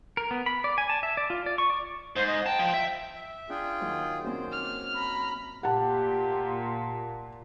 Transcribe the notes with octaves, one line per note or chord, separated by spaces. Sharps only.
A#4
B3
B5
D5
G#5
A5
E5
D5
F4
D5
C#6
D5
G#2 C5
D#5
G5 A5
F3
E5
E5
D4 F4 G#4 G5 F#6
D#2 F#3 F6
F#2 A#3 C4 C5
D6 F6
A#5 B5
A#2 G4 F#5 A5